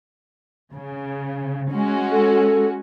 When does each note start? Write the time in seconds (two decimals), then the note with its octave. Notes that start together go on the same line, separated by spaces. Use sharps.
0.72 C#3
1.71 G#3 C#4 F#4
2.11 A4